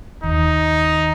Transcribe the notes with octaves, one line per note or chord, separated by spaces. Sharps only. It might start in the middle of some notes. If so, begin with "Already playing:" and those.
D#2 D#3 D#4